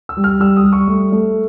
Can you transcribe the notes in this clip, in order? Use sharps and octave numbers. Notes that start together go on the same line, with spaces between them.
E6
G3
F6
G3 E6
D#6
G3
C#6
A3
A3